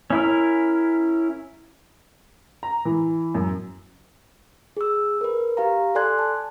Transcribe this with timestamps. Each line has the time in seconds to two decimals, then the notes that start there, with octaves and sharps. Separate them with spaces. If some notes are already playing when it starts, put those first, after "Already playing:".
0.10 C#4 E4 A#4
2.63 A#5
2.85 E3
3.35 F#2
4.77 G#4 E6
5.21 A#4 B4
5.57 G4 F5 A#5
5.95 A4 D5 G#5 C6 F#6 G#6
6.19 A5